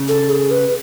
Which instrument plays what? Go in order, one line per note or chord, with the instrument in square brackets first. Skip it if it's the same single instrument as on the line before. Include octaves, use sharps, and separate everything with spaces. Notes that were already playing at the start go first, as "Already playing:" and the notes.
Already playing: [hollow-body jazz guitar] C#3
[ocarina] A4
G#4
B4